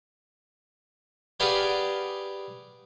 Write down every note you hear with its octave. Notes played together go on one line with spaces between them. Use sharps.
G4 G#4 B4 D5 F5 F#5